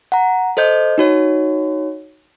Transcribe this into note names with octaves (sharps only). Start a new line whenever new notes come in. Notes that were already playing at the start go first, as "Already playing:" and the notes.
F#5 A#5
A4 C5 D#5 G6
D#4 F#4 C#5